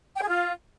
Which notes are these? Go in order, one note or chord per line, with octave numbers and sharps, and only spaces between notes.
G5
G#4
F4